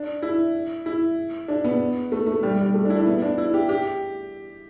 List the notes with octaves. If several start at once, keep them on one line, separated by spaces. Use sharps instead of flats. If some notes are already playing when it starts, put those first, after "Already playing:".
Already playing: D4
E4
E4
D4
B3
A3
A3
G3
G3
A3
D4
E4
D4
B3
D4
E4
G4
G4